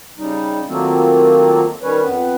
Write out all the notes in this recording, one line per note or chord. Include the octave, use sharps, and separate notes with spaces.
C#3 G3 D#4
D#3 F#3 A3 A#3 C4 F4
D#3 G3 C#4 B4 C#5
F2 B3 B4